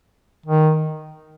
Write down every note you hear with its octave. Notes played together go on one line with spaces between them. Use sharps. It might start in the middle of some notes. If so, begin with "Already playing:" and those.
D#3